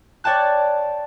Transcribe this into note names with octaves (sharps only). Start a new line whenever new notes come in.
C#5 D5 G5 A5 F#6